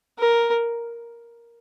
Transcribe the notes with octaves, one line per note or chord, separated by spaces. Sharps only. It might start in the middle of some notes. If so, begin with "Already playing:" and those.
A#4